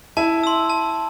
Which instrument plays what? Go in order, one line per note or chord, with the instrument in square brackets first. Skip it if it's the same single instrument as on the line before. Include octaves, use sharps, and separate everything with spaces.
[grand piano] E4 [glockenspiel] A5
[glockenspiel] C6 E6
A5